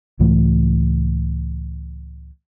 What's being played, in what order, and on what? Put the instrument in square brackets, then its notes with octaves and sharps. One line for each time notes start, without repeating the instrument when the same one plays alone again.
[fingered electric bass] C#2 A2 E3 A3